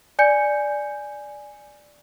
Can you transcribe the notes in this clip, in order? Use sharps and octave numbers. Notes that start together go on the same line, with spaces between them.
D5 G#5 G6 C#7